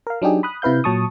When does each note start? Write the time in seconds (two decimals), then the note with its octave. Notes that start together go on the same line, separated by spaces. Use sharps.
0.07 A#4 F5
0.22 F#3 D4 D#4 G4 G#4
0.43 B5 D#6 F#6
0.62 C3 E4 B4 F5 G6
0.84 A#2 F#3 A5 C#6 D#6